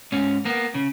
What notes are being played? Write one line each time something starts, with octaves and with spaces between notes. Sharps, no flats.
G#2 C#4
A#3 B3
C#3